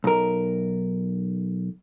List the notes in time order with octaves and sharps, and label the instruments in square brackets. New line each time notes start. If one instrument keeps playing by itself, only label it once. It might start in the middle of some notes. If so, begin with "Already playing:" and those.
[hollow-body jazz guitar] B1 A#4